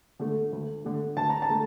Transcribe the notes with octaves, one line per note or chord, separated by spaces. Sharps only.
D3 A3
D2
D3 A3
D2 A5
A#5
A5
D3 A3